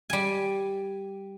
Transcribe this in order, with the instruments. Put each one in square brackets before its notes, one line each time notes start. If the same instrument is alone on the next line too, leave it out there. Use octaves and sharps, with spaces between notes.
[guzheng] G3 G#5